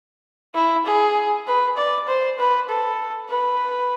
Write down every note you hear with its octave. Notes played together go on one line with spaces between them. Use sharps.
E4
G#4
B4
D5
C5
B4
A4
B4